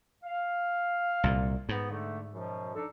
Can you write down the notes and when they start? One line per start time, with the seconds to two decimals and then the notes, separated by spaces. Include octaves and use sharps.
0.23 F5
1.24 C2 A#2
1.69 G#2 B3
1.89 D3 A3
2.31 F#2 B2 F3
2.74 D4 D#4 A4